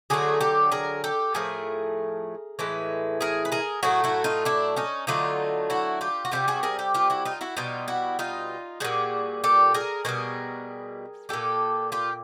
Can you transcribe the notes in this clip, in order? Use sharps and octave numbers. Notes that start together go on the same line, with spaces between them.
D3 F#3 A3 F#4 G#4
G4 A4
G#4 A#4
G4 A4
A2 F3 A3 G#4 A#4
A2 E3 G#3 B4
G#4 A#4
B4
G#4 A#4
A2 F#3 A3 F#4 G#4
E4 F#4
D#4 F4
D4 E4
C#4 D#4
D3 F#3 A3 D#4 F4
E4 F#4
F4 G4
F#4
C3 E3 G3 F4 G4
F#4 G#4
G#4 A#4
G4 A4
F4 G4
E4 F#4
D#4 F4
E4 F#4
B2 G3 D#4 F4
E4 F#4
D#4 F4
A#2 G3 F#4 G#4
G4 A4
G#4 A#4
B2 G3 G#4 A#4
A#2 G3 G4 A4
F4 G4